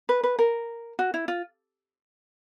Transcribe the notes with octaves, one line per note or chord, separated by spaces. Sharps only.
B4
B4
A#4
F#4
E4
F4